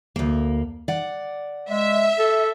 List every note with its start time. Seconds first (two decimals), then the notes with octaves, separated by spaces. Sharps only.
0.16 D2 A#3
0.88 D5 F#5
1.70 G#3 E5
2.19 A4